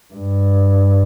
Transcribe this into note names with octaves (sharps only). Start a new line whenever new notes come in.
G2